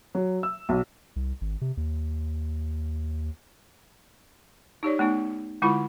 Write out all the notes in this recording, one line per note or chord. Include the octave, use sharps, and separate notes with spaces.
F#3
E6
B1
C2
G#1
C3
D#2
D#4 G4 C#5 D5
A3 B3 D#4
D3 G#3 E4 F4 F#5 B5